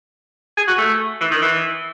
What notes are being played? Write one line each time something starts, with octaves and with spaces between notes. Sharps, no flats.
G#4
F#4
A3
E3
D#3
E3